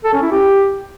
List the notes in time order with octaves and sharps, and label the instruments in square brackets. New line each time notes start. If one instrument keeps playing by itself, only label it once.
[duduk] A4
C#4
E4
G4